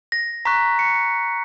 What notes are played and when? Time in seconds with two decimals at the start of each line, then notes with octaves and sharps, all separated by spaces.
0.12 A#6
0.45 A#5 C#6 F#6 B6
0.79 C#7